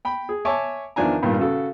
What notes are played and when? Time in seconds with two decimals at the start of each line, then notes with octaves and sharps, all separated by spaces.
0.05 G5 B5
0.29 G#4
0.45 C#5 E5 G#5 A5 C#6 D6
0.96 E2 D#3 F3 D4 G#5 A#5
1.23 G2 A#2 D#3 G3
1.39 C#3 F#4 A4